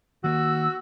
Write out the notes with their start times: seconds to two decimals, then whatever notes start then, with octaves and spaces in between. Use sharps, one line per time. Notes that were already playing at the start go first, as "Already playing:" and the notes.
0.24 D#3 A#3 F#4 E6